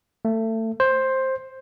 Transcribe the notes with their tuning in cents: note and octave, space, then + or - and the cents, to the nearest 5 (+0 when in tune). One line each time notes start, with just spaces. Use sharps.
A3 +25
C5 +10